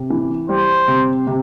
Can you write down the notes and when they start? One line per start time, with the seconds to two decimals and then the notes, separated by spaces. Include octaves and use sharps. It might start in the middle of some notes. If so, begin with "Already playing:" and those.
Already playing: C3
0.10 E3
0.49 G3 C5
0.88 C3
1.27 C3